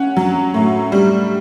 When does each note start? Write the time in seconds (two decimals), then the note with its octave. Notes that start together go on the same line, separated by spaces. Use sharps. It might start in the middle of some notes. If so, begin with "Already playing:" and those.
Already playing: C#4 F#5
0.17 F#3
0.54 A2
0.92 G3